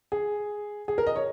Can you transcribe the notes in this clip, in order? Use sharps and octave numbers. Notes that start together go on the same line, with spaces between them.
G#4
G#4
A#4
D#5
C#5